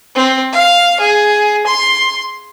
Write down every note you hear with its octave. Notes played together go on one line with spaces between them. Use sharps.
C4
F5
G#4
C6